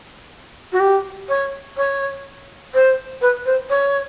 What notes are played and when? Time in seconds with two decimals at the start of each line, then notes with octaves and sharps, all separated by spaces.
0.72 F#4
0.80 G4
1.29 C#5
1.77 C#5
2.74 C5
3.21 B4
3.45 C5
3.69 C#5